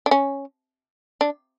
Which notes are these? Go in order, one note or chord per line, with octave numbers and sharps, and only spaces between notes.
D4
C#4
D4